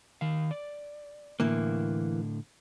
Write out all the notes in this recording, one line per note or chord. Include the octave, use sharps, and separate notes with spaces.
D#3 F5
D5
A2 D3 E3 A#3